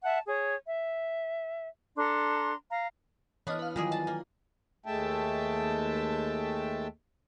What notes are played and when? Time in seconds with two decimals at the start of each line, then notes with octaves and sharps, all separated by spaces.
0.03 E5 F#5 A5
0.26 G#4 C#5
0.66 E5
1.96 D4 A4 A#5 C6
2.70 F5 A#5
3.47 E3 B3 D4 C#5 D#5 F6
3.59 B4 F5
3.76 D#3 E3 F#3 G3 F4 G#4 G#5
3.92 D#5 A5
4.07 A#3
4.86 D#2 G#3 A3 E5 G5 A5